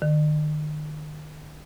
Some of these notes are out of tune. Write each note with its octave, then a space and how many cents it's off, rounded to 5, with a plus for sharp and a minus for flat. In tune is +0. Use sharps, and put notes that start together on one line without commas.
D#3 -40